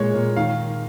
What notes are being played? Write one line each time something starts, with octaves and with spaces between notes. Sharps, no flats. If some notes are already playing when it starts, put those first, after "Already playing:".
Already playing: A#2 G#3 C#5
A#2
D#3 F5